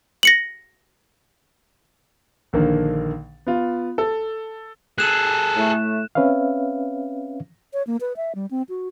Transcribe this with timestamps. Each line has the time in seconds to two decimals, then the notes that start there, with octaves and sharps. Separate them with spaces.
0.23 A#6 C#7 F#7
2.53 A#1 D3 D#3 A#3
3.46 B3 F4
3.98 A4
4.98 G#4 A4 F#6 E7
5.55 A2 A3
6.15 C4 C#4 B4 C#5 E5 F5
7.73 C#5
7.87 A#3
8.01 B4
8.16 E5
8.35 G3
8.51 C4
8.69 F#4